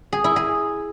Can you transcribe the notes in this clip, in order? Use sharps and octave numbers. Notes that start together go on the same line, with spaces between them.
G#4
E4
G#4